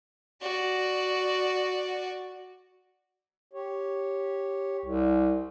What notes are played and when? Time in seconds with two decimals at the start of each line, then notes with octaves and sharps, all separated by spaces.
0.42 F#4 D5
3.53 G4 C#5
4.86 C2